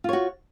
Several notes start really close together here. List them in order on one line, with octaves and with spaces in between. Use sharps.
F4 C#5 F#4